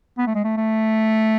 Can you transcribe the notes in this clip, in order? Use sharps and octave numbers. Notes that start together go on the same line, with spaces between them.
B3
A3
G#3
A3
A3